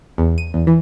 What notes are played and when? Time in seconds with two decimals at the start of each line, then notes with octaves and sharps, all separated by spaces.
0.18 E2
0.38 D#7
0.54 E2
0.67 E3